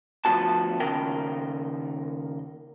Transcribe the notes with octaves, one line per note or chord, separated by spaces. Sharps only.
D2 F3 G#3 B3 F#4 A5
D#2 C#3 A#4 G5